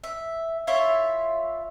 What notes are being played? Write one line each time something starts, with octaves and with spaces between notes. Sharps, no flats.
E5
E4 F4 C#5 E5